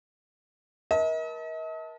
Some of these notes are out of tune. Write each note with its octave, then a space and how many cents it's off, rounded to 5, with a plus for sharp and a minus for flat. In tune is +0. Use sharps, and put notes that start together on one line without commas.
A#4 +35 D#5 +45 A5 +0